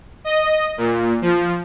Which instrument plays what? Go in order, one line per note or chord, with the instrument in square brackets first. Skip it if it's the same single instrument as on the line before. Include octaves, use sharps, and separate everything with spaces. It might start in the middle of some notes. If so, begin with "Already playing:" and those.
[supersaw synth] D#5
A#2
F3